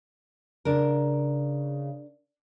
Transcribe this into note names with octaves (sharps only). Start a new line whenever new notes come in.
C#3 D4 A#4